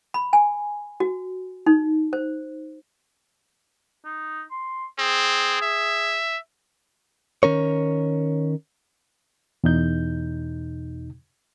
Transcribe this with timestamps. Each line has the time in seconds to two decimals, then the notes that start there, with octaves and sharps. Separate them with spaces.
0.14 B5
0.33 G#5
1.00 F#4
1.66 D#4
2.13 C5
4.05 D#4
4.51 C6
4.99 C4 G#4
5.62 E5
7.43 D#3 C#4 A#4 C#5
9.64 E2 B2 D#4 G6